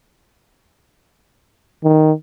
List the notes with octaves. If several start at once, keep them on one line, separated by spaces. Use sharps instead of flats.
D#3